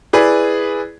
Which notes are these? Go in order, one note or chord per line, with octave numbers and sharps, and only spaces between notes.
E4 G#4 B4 D5